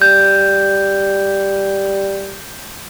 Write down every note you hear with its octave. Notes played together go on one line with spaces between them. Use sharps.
G3 G6